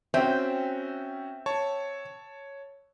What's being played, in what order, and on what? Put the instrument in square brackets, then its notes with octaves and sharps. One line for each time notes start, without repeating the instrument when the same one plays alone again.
[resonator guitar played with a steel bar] C4 [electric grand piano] C#4 F#4 [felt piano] E5 G5
[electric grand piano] C#5 A5 C#6